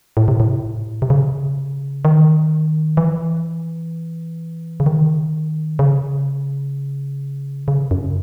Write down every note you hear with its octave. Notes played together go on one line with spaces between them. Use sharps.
A2
C3
A2
C3
C#3
D#3
E3
C#3
D#3
C#3
C#3
F#2